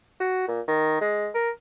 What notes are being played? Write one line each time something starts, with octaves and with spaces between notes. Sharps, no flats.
F#4
A#2
D#3
G#3
A#4